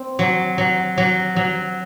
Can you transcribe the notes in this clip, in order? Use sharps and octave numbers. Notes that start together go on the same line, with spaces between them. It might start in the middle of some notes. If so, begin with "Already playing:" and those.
Already playing: C4
F#3
F#3
F#3
F#3